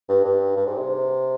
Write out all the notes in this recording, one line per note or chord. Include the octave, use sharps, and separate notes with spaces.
G2
G2
G2
G#2
C3